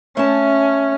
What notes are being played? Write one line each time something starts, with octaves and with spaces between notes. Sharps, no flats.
A3 C#4 A5